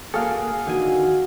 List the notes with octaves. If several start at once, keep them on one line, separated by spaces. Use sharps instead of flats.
A#3 F#4 G#4 A4 F5
D3 D#3 F#4 G#5